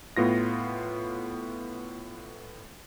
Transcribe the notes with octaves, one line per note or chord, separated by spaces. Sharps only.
A2 B3 F4 A#6